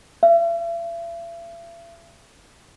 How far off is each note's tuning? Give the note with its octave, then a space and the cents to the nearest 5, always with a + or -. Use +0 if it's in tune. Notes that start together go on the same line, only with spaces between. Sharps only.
E5 +45